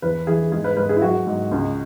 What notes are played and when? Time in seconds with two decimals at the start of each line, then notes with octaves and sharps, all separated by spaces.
0.02 E2 B4
0.27 E3 G#4
0.52 G#2 G#4
0.64 B4
0.77 G#2 B4
0.89 G#4
0.96 E4
1.02 F#3 F#4
1.27 G#2
1.52 C#2